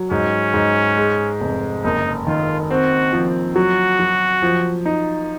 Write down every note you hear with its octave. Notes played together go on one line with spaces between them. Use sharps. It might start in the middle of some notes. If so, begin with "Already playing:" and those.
Already playing: F#3
G#2 C#4
G#2
G#3
F1
F#1 D#4
D#3 F4
C4 F#4
F3
F#3 F#4
F#3
F3
D#4